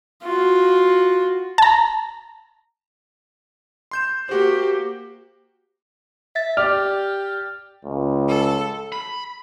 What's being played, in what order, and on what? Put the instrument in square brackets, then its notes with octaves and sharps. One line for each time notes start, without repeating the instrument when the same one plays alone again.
[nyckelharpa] F4 F#4
[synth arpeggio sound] A5 A#5
[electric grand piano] C6 G6 E7
[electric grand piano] A#3 F#4 C5 [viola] G4
[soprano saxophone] E5 [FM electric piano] A6
[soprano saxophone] G4 [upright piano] D5 [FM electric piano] F6
[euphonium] C#2
[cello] A4
[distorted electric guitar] B5